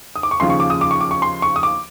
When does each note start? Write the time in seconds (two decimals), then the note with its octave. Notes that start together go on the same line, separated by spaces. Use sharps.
0.16 D#6
0.23 D6
0.31 C#6
0.40 D#2 C#3 F3 C6
0.50 C#6
0.60 D6
0.70 D#6
0.81 D6
0.91 C#6
1.01 D6
1.11 C#6
1.22 C6
1.42 C#6
1.56 D#6
1.63 D6